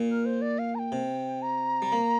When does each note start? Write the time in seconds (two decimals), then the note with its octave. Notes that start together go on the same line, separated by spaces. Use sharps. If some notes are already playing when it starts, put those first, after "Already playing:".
Already playing: A#2
0.09 A#4
0.25 C5
0.42 D5
0.59 F5
0.75 A#5
0.79 G5
0.92 C3
1.42 A#5
1.82 G3
1.92 A#3